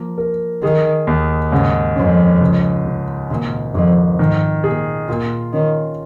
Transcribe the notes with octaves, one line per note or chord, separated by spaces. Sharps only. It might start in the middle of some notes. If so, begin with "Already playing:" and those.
Already playing: F3 A#3
A#4
D#3 G#4
D#2
G#2 C#3
F2 C#4
C#2
C#3
G#1 A#2
G#1 F2
G#2 D#3
A#2 G#4
A#2 F4
D#3 C#4